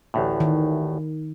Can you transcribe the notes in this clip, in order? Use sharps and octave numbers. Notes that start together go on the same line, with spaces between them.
A1 D2 A2
D#3